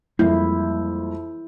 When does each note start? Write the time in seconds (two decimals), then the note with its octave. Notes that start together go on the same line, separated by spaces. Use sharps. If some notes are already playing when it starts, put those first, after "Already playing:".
0.19 F2 G3 G#3 A#3 E4 G6